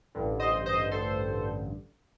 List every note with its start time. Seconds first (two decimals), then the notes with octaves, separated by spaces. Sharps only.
0.15 A1 G2 D3
0.39 C5 D#5
0.66 C5 D#5
0.91 A4 C5